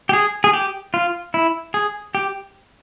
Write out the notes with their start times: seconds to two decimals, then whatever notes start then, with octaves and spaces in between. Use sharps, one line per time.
0.09 G4
0.13 G#4
0.44 G#4
0.53 G4
0.94 F4
1.34 E4
1.74 G#4
2.15 G4